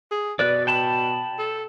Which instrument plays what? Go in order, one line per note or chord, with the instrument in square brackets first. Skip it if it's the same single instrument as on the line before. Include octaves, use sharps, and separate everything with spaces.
[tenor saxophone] G#4
[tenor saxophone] B2 [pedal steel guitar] B4 D5
[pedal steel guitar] G5 A5 B5
[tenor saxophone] A4